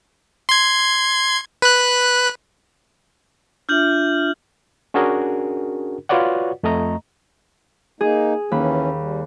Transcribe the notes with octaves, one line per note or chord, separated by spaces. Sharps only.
C6 G#6
B4 F#6
D4 F4 E5 F6 G6 F#7
C#4 D4 F#4 G#4 A#4
F4 F#4 B4 C#5 D5 F#5
F2 A3 D#5 A#5
A#3 D#4 G#4
D#2 E3 C#4 B5
G3